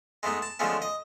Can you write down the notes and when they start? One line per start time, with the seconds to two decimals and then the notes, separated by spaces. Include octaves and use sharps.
0.23 G#3 A3 B3 D#4
0.42 A5
0.59 D3 F3 G#3 A3 B3 C#4
0.82 D#5